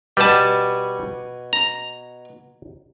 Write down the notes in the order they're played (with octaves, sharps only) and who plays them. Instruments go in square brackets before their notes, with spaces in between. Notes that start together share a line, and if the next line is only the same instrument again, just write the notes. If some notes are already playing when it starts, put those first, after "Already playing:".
[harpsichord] B2 F#4 G#5 [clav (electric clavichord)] G3 A5
[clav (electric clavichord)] A#5